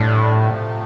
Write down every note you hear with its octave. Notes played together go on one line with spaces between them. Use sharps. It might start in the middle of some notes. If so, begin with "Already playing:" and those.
Already playing: A2 D3 G3 D4
C3 F3 A3